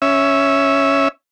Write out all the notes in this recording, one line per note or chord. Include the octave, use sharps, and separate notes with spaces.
C#4 E5